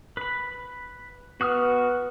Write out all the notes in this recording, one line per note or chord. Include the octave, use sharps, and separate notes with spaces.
B4 B5
B3 F#4 D#6 F6